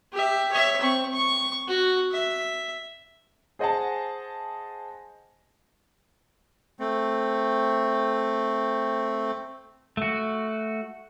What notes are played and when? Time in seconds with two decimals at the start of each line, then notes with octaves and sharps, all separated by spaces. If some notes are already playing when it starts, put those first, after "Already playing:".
0.13 G4 E5
0.51 C#5 E5
0.81 C4 C#6
1.13 C#6
1.67 F#4
2.12 E5
3.59 G#4 C5 D#5 F#5 G#5 A5
6.79 A3 C4
9.97 A3 F#4